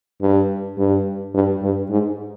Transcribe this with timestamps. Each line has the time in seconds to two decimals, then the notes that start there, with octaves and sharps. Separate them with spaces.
0.22 G2
0.78 G2
1.34 G2
1.63 G2
1.90 G#2